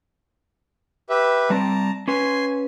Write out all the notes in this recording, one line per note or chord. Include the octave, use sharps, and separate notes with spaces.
G4 B4 E5
G3 C4 D5 A5 A#5
C#4 B4 G#5 C6